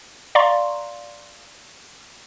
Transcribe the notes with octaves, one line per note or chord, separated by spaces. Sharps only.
D5 F5 A#5 C6 C#6